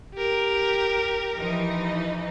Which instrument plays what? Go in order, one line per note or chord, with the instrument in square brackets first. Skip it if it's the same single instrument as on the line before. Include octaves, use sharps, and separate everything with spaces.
[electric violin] G4 A#4
[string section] E3 F3 D#4